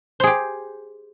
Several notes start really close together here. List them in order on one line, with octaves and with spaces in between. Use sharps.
C5 G#4 G4